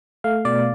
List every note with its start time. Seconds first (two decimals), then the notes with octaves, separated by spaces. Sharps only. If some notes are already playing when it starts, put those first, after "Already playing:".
0.24 A3 F5
0.45 B2 D5